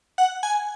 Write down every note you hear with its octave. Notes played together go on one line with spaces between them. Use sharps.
F#5
G#5